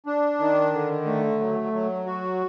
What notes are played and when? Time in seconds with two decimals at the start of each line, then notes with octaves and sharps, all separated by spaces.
0.06 D4
0.39 D#3
0.73 D3
1.06 A3
1.40 F#3
1.73 F#3
2.06 F#4